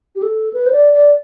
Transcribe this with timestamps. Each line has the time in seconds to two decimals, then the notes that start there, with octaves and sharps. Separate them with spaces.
0.16 G4
0.22 A4
0.53 B4
0.66 C5
0.72 D5
0.93 D5